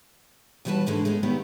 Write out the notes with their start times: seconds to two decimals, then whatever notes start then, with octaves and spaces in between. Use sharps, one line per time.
0.65 D#2 E3 G3 F#4 B4 A5
0.86 G#2 D3 E3 G#3 A3
1.05 G#3 A3 B3 C#4
1.23 A#2 D#3 B3 C4 E4 G4